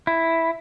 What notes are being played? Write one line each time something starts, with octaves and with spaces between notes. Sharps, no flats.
E4